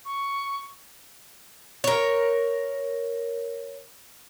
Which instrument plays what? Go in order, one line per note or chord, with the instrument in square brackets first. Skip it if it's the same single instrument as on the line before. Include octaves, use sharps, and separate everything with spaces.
[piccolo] C#6
[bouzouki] A#4 C#5